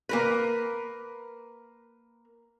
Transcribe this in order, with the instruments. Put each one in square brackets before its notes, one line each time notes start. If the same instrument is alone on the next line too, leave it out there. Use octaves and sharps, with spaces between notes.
[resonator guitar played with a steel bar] A#3 A#4 B4